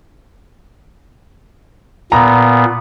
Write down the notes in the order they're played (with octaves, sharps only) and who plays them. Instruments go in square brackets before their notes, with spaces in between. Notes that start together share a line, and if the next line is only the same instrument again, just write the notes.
[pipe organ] A#2 B3 [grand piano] A#5